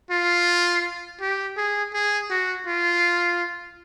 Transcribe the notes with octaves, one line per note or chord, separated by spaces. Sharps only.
F4
G4
G#4
G#4
F#4
F4